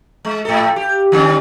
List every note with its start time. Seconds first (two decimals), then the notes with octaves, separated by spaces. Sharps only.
0.25 G#3
0.45 G#2 A4
0.76 G4
1.12 D3 G3 C#4